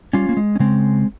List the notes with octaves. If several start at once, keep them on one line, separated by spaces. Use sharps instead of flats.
G3 C#4 F4
A#3
G#3
C#4
C#3 G#3 C4